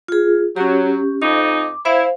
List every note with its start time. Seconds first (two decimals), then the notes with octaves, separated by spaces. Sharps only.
0.08 F4 G#4
0.56 F#3 C#4 G4
1.22 F2 D#4 D6
1.85 E4 C5 F5